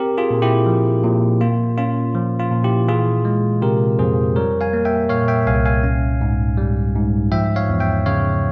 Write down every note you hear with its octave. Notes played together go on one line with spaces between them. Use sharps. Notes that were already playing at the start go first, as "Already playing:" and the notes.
Already playing: C4 G4 A#4
F4 G#4
A#2
E4 G4
F3
A#2
A#3 F4
C#4 F4
F3
F4
A#2
E4 G4
E3 F4 G#4
G#3
C3 G4 A#4
F2 G#4 C5
G3 A#4 C#5
F5 G#5
A#3
E5 G5
A#2 C#5 F5
E5 G5
C2 F5 G#5
F5 G#5
C#4
G#2
G3
G#2
F3 E5 G5
C#5 F5
E2
E5 G5
C#3 C#5 F5